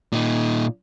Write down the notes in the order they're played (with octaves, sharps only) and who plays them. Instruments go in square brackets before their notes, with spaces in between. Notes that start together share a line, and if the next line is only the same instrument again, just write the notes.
[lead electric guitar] A#2 D#4